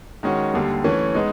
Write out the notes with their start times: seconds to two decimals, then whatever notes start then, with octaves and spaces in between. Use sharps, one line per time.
0.23 D#3 G#3 C#4 F#4
0.54 D#2 D3 G3
0.84 E3 A3 C#4
1.15 G#3 B3 D#4